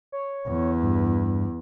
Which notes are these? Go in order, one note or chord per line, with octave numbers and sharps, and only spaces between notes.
C#5
E2
G2